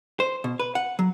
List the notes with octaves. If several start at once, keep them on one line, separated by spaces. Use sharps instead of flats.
C5
B2
B4
F#5
F#3